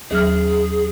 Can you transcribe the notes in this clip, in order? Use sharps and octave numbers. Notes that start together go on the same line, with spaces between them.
D#2 F#3 G#4 F6